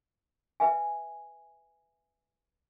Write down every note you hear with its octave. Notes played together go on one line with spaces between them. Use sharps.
B4 E5 G#5